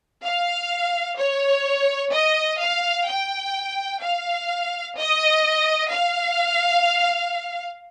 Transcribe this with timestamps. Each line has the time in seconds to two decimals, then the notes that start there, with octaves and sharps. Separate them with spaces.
0.23 F5
1.17 C#5
2.12 D#5
2.60 F5
3.07 G5
4.02 F5
4.97 D#5
5.92 F5